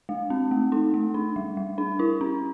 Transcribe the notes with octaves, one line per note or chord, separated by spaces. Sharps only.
G#3
C4
A3
D#4
A3
D4
G3
G3
D4
E4
C#4